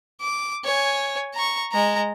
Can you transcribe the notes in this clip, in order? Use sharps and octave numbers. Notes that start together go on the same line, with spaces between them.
D6
C#5 G#5
A#5 C#6
G#3 A#5